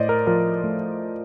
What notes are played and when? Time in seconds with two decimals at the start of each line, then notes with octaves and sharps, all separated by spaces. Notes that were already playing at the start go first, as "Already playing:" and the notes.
Already playing: A2 A3 C5 D5 D#5
0.09 A#4
0.27 F3 A#4
0.64 A3